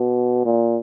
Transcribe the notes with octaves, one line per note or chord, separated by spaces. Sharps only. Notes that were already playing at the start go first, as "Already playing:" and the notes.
Already playing: B2
A#2